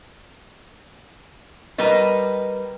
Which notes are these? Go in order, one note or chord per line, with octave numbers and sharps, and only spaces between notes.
G3 A#4 B4 D#5